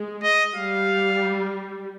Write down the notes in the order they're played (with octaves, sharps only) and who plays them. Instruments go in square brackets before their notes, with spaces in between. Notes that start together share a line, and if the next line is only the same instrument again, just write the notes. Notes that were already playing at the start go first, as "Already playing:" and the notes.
Already playing: [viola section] G#3
[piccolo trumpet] D#5
[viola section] G3 [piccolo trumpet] F5